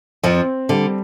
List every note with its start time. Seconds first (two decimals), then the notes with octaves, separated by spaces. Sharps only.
0.23 F2 F3 C4
0.69 D3 G3